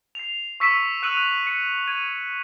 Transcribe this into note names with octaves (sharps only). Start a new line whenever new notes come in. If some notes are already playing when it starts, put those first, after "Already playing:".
C7 F7
C#6 E6 B6 C#7 D#7 E7
E6 F#6 C#7 D#7 F7 F#7
C#7
G#6 D#7